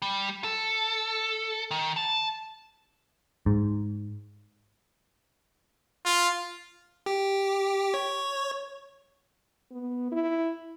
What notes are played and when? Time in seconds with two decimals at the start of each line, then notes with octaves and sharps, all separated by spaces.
0.02 G3
0.44 A4
1.71 D#3
1.97 A5
3.46 G#2
6.05 F4
7.06 G4
7.94 C#5
9.71 B3
10.12 E4